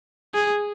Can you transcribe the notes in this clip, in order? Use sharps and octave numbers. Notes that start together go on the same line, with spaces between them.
G#4